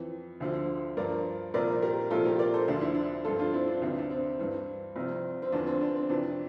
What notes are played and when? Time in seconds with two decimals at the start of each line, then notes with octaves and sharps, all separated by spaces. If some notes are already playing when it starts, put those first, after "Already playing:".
Already playing: F2 E3
0.40 D2 D3 F3
0.97 G2 F3 A#4 D5
1.54 C2 A#2 F3 A#4 D5
1.82 G4 A#4
2.11 C2 A#2 F3 F4 A4
2.26 G4 A#4
2.39 A#4 D5
2.54 A4 C5
2.68 D2 D3 F3 D4
2.81 E4
2.95 D4
3.25 G2 F3 F4 A4
3.39 D4 F4
3.53 C4 E4
3.68 D4
3.82 D2 C3 E3 C4
3.99 D4
4.10 C4
4.39 G2 E3
4.96 C2 C3 F3
5.42 C4
5.52 E2 D3 F3 D4
5.67 C4
5.81 D4
5.95 C4
6.09 F2 C3 E3 D4